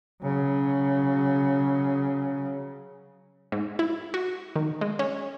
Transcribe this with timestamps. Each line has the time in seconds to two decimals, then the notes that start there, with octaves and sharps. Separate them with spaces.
0.22 C#3 F#3
3.52 G#2
3.79 E4
4.14 F#4
4.56 D#3
4.81 G#3
4.99 C#4